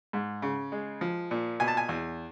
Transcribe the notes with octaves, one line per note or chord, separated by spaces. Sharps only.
G#2
C#3
G#3
F3
A#2
B2 G#5
A5
G#5
E2